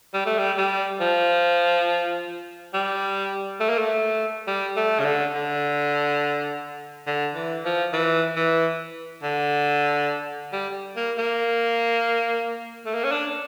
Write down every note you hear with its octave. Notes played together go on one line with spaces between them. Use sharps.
G3
A3
G3
G3
F3
G3
A3
A#3
A3
G3
A3
C#3
D3
D3
D3
E3
F3
E3
E3
D3
G3
A#3
A#3
A3
A#3
C#4
D4